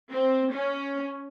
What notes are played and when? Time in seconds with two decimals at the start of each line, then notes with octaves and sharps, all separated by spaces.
0.11 C4
0.52 C#4